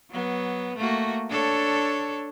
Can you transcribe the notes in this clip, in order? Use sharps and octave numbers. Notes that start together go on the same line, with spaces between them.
F#3 B3
A3 A#3 F#4
D4 A4 C#5